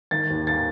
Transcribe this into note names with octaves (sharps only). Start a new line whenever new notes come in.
D#3 A6
D#2
A6